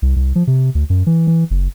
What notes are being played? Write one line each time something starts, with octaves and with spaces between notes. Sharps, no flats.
C2
C2
F3
C3
D2
F#2
E3
E3
F#1